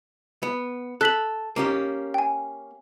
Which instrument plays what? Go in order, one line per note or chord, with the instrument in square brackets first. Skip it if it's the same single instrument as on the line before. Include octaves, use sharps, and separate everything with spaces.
[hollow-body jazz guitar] B3
[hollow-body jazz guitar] A4 [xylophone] F#6 B6 F#7
[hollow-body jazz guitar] A#3 C#4 G4
[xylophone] G5 G#5